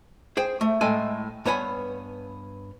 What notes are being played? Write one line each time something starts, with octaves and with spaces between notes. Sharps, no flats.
G#4 C5 G5
A3
A2 G#3 A4 G5 G#5
G2 B3 C#5 F#5 G#5 B5